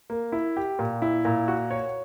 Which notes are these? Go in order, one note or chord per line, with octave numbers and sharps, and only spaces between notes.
A#3
E4
G4
A#2
E4
A#2
F#4
C#5